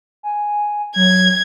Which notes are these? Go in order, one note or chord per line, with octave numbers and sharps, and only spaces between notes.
G#5
F#3 G#6